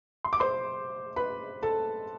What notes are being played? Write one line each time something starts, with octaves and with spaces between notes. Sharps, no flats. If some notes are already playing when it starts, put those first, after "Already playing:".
C6
D6
C5 C6
B4 B5
A4 A5